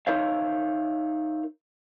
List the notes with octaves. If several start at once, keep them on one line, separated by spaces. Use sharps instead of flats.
D#4 A#4 C5 C#5 E5 F5